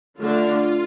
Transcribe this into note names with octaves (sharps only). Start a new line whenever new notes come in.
D3 A3 D4 F4